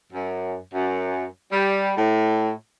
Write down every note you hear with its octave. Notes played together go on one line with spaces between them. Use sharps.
F#2
F#2
G3
A2